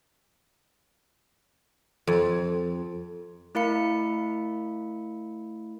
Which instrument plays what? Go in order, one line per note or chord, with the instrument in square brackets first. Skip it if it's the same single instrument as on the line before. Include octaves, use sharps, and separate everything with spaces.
[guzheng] F2
[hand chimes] A3 E4 A#4 F5 B5 C#7